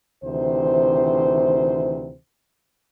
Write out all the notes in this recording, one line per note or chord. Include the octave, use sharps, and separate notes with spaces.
D2 C3 D#3 E3 C5